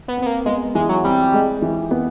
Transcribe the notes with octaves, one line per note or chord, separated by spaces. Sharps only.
B3
C4
B3
A#3
G#3 B3
E3 G#3
F#3
G3 C4
G#3
E3
B3